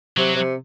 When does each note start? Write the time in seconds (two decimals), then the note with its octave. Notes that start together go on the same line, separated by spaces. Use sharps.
0.17 C3 F#3
0.36 C3